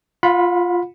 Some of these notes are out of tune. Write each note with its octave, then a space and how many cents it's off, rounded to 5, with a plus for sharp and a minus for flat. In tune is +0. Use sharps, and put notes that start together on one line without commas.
F4 +0 F#5 -45 B5 +0